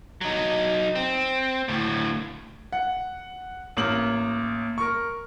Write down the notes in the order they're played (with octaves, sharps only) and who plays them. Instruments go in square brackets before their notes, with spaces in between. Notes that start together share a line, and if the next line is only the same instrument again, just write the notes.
[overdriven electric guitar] F#3 D#4
C4
D2 A2
[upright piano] F#5
A1 A#3 F#7
A#4 C#6